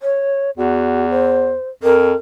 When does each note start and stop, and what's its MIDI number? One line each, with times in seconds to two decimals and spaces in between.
0.01 0.50 73
0.57 1.57 40
0.57 1.06 66
1.10 1.68 72
1.83 2.14 41
1.83 2.16 70